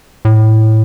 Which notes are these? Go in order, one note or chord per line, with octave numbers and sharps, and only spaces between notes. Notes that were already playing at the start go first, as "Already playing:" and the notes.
A2